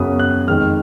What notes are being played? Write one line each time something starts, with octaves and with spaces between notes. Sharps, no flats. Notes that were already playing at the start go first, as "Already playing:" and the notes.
Already playing: F#2 C#3 F#3 B3 D#6
F#6
F2 D#3 G#3 F6